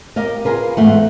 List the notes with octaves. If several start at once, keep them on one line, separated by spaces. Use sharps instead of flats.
G4 A#4 D#5 F5
F4 G#4 A#4 B4
E2 G#2 A3 F#5